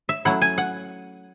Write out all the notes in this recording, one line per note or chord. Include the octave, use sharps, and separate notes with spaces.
E5
F#3 A3 C#4 E4 F#5
G#5
F#5